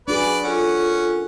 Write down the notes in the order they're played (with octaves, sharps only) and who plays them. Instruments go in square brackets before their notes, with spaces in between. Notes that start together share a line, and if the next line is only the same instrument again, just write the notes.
[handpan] D4 F#4 G#4 [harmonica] B4 D5
[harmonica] C#4 F#5 [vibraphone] F4 A4 A#4